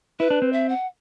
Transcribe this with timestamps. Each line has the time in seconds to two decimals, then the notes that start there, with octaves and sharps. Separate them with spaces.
0.20 E4 B4
0.30 D4
0.42 C4
0.53 E5
0.69 F#5